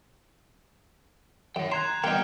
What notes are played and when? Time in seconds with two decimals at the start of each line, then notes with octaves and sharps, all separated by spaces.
1.56 F#2 C#5 G5
1.72 A#5 C6 F#6 G#6 E7
2.04 G3 A#3 B3 D#4 G5 F6 C#7 G7